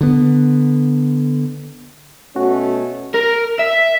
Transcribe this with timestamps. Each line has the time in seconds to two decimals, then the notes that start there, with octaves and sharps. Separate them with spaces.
0.01 D3 B3
2.36 B2 A3 C#4 F#4
3.14 A#4
3.59 E5